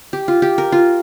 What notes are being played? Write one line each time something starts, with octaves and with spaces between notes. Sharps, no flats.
G4
F4
G4
A#4
F4